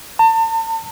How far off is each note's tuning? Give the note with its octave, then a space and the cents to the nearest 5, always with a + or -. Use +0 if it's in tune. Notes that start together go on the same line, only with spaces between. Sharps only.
A5 +40